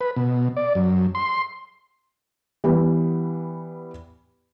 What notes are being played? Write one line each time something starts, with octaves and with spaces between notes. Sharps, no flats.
B4
B2
D5
F#2
C6
E3 G3 B3